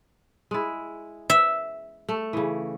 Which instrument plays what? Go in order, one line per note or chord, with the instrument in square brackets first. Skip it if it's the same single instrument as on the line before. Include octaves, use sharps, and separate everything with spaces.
[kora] G#3 E4
[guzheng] E5
[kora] A3
C#3 E3